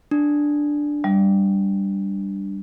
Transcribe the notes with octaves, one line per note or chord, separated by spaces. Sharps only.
D4
G3